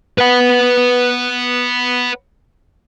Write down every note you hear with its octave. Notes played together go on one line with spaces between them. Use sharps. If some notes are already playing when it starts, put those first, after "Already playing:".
B4 F#5